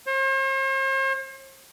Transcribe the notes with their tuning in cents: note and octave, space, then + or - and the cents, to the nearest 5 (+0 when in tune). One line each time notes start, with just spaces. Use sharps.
C5 +45